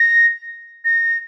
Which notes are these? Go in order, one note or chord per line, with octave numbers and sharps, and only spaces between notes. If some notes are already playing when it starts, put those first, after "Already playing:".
Already playing: A#6
A#6